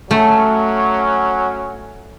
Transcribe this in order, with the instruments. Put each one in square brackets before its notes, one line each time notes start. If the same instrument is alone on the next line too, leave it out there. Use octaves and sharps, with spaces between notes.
[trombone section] F#3 C#4 [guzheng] A3